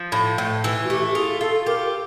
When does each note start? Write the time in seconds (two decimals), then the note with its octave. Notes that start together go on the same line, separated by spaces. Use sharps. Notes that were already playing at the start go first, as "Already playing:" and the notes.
Already playing: F3
0.12 A2
0.38 A2
0.64 E3
0.85 F#4
0.89 A3 G4
1.10 G4
1.15 F4 G#4
1.41 F4 A4
1.66 G4 A#4